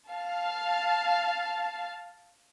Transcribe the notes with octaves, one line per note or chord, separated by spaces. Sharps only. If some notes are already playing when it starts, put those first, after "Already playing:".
F5 A5